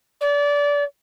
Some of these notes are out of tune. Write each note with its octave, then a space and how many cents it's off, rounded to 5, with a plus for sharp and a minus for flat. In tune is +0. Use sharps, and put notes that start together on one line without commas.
D5 -25